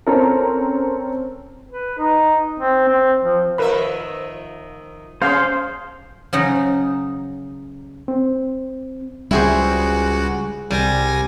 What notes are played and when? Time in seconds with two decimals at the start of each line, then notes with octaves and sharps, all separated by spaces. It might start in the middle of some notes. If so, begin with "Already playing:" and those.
0.07 C4 C#4 A4 A#4
1.70 B4
1.98 D#4
2.60 C4
2.88 C4
3.24 F3
3.58 D#3 F3 A#4 B4 E5 B5
5.22 C#4 G#4 C5 F5
6.33 C#3 F#3 D#4
8.08 C4
9.31 C#2 G3 E4 F#4 G#4 C5
10.71 C2 G3 G#5 A#6